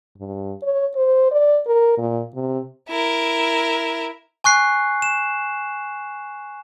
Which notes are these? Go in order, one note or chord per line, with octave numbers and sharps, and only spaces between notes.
G2
C#5
C5
D5
A#4
A#2
C3
E4 A#4
G#5 C#6 F#6 C7
E7